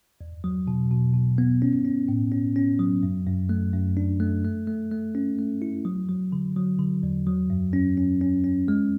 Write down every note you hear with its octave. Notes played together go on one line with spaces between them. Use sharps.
E2
F#3
B2
B2
B2
B3
C#4
C#4
A2
C#4
C#4
F#3
F#2
F#2
A3
F#2
D4
A3
A3
A3
A3
C#4
A3
E4
F#3
F#3
D3
F#3
D3
E2
F#3
F#2
C#4
C#4
C#4
C#4
G#3